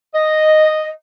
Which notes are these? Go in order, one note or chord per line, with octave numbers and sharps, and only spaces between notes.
D#5